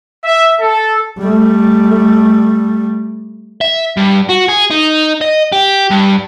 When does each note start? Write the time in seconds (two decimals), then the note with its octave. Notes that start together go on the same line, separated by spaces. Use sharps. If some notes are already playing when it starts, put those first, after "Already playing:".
0.24 E5
0.61 A4
1.18 G3 A3
3.61 E5
3.97 G2
4.29 F#4
4.48 G#4
4.70 D#4
5.21 D#5
5.52 G4
5.90 G2